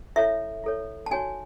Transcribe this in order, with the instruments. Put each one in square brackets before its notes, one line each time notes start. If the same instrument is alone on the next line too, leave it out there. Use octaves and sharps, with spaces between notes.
[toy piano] E4 A4 C#5 E5
E4 A4 C#5
A5
D#4 F#4 C#5 G#5